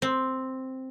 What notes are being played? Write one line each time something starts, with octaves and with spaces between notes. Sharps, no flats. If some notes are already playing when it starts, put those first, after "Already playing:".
C4